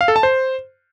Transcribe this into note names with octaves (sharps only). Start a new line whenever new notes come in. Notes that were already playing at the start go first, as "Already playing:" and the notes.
F5
A4
A5
C5